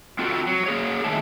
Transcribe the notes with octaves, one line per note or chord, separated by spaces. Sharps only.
C4 F4 F#4 A4
F#3
A#3 G#4 C#5
D#3 F#3 A3 G#4 A5